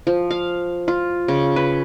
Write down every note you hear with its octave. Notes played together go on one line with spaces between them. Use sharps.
F3
F5
F4
C#3
B4